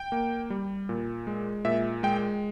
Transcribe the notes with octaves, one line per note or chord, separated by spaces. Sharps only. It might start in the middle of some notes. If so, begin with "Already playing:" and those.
Already playing: G5
A#3
G3
A#2
G#3
A#2 E5
G#3 G5